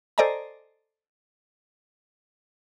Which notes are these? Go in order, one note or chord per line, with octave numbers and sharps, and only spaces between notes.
A4 C5 D5 D#5 G#5 A#5